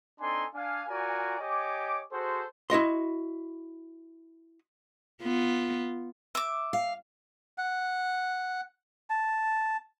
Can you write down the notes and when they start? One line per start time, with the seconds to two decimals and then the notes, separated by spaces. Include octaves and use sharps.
0.20 C4 D4 D#4 A4 G#5 C6
0.54 D4 F5 G#5
0.88 F4 F#4 A#4 D5 G#5
1.40 G4 C#5 D#5 G#5 D6
2.12 F#4 G#4 A4 C5
2.70 E4 F#4 D#5 C6
5.22 B3 F4
6.35 E5 D6
6.73 F5
7.58 F#5
9.10 A5